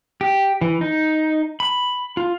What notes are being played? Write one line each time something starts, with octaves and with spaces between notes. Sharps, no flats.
G4
E3
D#4
B5
F4